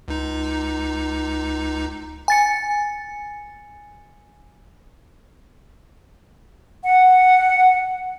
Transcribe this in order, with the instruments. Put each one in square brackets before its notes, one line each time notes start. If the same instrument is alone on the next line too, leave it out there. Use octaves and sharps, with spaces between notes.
[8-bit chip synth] C#2 D#4
[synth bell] G#5 A6 C#7
[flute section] F#5